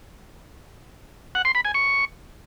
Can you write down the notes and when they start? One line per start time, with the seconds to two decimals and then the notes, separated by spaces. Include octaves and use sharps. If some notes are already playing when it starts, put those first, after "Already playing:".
1.35 F#5
1.45 C6
1.55 B5
1.65 G#5
1.74 C#6